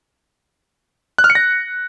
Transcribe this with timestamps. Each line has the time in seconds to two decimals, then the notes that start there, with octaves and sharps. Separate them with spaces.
1.18 F#6
1.24 F6
1.30 C#7
1.35 A#6